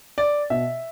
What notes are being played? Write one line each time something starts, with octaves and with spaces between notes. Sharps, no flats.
D5
B2 E5